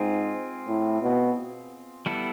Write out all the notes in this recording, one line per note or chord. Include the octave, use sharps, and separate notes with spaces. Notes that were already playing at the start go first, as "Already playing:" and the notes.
Already playing: G#2 C4 F4 G#4
A2
B2
G3 B3 E4 A4